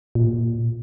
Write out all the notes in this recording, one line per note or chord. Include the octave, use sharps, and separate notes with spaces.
A#2